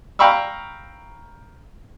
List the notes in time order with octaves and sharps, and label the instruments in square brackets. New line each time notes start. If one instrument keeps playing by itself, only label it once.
[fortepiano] F5 G5 A#5 B5 C#6 E6